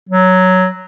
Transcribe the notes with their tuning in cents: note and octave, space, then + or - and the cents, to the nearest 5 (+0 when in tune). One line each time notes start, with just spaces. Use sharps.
F#3 +5